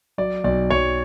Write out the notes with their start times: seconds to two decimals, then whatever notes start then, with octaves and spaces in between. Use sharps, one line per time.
0.18 F#3 D5
0.44 B1 D5
0.70 B1 C#5